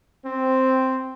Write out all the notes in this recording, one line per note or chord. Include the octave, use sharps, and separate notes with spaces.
C4